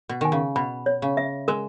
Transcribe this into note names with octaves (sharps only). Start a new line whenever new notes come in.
B2
D#3 G#5
C#3
B2 B5
C#5
C#3
E5
G#3 A#4